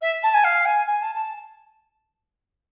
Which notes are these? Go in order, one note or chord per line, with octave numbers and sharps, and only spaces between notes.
E5
A5
G#5
F5
G#5
G#5
A5
A5